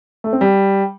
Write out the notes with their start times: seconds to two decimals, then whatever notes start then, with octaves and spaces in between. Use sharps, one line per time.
0.24 A3
0.33 C4
0.41 G3